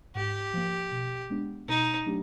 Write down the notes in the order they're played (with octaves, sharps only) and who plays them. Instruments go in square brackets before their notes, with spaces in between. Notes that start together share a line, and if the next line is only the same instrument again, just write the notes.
[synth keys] G#2 [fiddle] G4
[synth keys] F3 A#3
B2
G#3 B3 D4
[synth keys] B2 [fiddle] D#4
[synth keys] F#3 A3 D4 G4